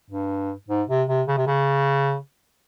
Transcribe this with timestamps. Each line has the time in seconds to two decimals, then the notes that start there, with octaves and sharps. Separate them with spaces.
0.11 G2
0.69 G#2
0.89 C3
1.08 C3
1.28 C#3
1.37 C3
1.47 C#3